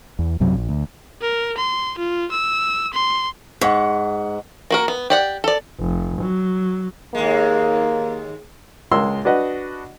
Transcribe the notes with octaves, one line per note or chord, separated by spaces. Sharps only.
E2
B1 F#2 C3 F#3
A#1
D2
A#4
C6
F4
E6
C6
G#2 F#5 C#6
A#3 F#4 A#4
B3
G4 D5 F#5
A4 D5
F1
F#3
D#2 G#3 A#3
C#2 G#3 F4 A#4 C6 E6
D4 F#4 B4 D#5 F#5